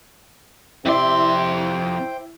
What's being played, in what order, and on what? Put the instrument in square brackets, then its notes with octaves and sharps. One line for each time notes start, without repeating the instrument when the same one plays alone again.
[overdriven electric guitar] F2 C6 [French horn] C3 [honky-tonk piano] E4 D5 E5 [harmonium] C5 G5